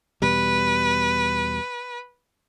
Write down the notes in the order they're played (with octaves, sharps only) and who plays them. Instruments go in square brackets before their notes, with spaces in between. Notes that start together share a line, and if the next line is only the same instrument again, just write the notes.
[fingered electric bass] E2 B2 G3 [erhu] B4